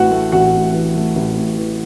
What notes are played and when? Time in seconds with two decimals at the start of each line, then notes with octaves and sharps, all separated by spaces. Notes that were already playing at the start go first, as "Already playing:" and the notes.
Already playing: A1 A2 E3 F#4 F#5
0.11 A3
0.32 A1 F#4 F#5
0.54 A2
0.74 E3
0.95 A3
1.15 A1
1.37 A2
1.58 E3